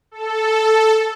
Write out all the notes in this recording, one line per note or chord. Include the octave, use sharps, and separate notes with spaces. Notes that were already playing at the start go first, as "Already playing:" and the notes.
A4